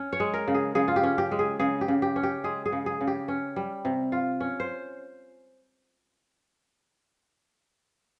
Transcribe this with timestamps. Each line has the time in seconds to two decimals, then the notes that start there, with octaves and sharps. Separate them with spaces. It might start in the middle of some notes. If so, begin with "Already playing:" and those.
Already playing: C#4
0.13 C#5
0.20 G#3
0.34 A#4
0.48 C#3
0.54 G#4
0.75 C#3 G#4
0.88 F4
0.96 G4
1.03 C#4
1.18 G4
1.31 G#3
1.39 G#4
1.60 C#3 G#4
1.81 G4
1.88 C#3
2.02 G4
2.16 C#4
2.23 G4
2.44 G#3 G#4
2.66 G#4
2.72 C#3
2.86 G#4
3.01 C#3
3.07 G4
3.28 C#4
3.56 G3
3.85 C3
4.12 F4
4.41 C#4
4.60 C5